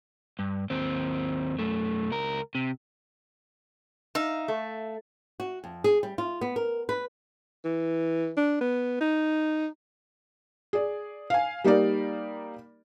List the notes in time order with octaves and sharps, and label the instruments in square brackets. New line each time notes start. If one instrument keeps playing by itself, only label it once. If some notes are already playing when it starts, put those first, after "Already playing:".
[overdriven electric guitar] G2
D#2 C4
F#2 A3
C#2 A#4
C3
[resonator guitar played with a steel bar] D#4 [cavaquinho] E5 F5
[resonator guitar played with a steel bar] A3
[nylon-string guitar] F#4
F2
G#4
G3
F4
B3
A#4
B4
[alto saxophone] E3
D4
B3
D#4
[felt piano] G#4 D5
F5 G#5
G3 A#3 D#4 G4 A#4 D5